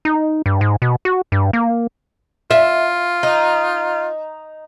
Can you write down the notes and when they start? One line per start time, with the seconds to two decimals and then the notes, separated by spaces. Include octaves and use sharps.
0.05 D#4
0.46 G2
0.61 G#2
0.82 B2
1.05 F#4
1.32 G2
1.53 A#3
2.51 F4 E5
3.23 D#4